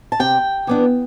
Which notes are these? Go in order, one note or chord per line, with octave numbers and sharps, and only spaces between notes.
A5
C3 G5
E3 B3 D4